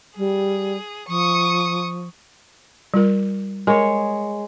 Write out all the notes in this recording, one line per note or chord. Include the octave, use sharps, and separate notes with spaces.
G3 G#4
F3 C#6 D#6
G3 F4 A#4
G#3 A#4 C#5